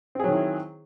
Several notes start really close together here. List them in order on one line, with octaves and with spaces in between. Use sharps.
C4 G#4 F#3 D#3 E4